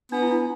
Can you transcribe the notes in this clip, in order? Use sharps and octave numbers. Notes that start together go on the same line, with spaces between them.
B3 D4
E4
D4